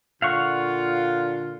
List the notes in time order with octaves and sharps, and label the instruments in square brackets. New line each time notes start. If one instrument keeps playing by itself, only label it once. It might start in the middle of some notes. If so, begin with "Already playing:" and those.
[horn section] A#2 D3 F4 [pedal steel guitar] F5 F#5 C#6